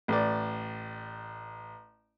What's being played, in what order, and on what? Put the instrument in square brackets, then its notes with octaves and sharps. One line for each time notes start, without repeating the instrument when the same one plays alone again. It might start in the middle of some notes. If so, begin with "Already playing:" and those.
[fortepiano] A1 D5